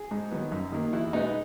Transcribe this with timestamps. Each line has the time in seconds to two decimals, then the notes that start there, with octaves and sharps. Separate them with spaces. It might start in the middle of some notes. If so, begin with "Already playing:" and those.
Already playing: G#4
0.11 G#2
0.31 D#3 F#3 B3
0.52 F#2
0.72 D#3 A#3
0.93 E2 E4
1.13 B2 G#3 B3 D#4